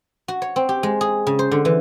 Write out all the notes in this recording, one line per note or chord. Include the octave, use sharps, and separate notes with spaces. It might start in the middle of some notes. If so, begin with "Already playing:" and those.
F#4
C#5
C4
G4
G#3
G#4
C#3
C5
D3
E3